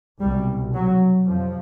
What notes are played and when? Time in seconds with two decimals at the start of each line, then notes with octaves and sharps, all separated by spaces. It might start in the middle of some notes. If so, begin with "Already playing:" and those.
0.20 C2 B2 G3
0.74 F#3
1.27 F2 C3 F3